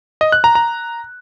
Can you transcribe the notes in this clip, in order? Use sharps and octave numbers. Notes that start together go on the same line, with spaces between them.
D#5
F#6
A#5
A#5